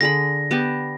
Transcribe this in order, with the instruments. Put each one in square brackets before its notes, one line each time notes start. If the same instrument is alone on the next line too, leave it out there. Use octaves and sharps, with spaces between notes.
[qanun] D3 G#4 B5 [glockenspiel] A#6
[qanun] B3 G4 A5